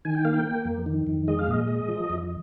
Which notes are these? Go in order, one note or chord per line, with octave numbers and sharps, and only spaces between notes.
D#3 G#5
G5
A#3 F5
G5
A#3
F2
D#3
F2
G#3 D#5
F5
A#2 D#5
G#3
F3
F2